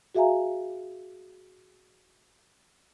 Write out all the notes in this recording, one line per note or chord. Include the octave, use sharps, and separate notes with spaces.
F#4 G#4 E5 F5 G#5 A#5